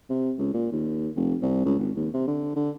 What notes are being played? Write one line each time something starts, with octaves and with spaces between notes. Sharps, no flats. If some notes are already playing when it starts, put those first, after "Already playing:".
C3
C#2
A#2
D#2
F1
C2
C#2
G#1
D#2
C3
D3
D3